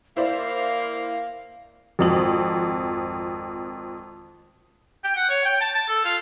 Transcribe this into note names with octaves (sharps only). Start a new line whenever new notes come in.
A#3 E4 C5 D5 F5
G#1 F2 F#7
G5
F#5
C#5
G5
A5
A5
A4
F4